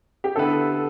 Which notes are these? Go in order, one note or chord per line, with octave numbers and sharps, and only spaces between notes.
G4
D3 B3 E4 A4 B4